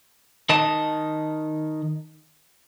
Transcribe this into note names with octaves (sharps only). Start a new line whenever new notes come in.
D#3 D#5 A5